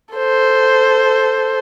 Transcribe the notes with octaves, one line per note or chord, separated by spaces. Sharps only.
A4 C5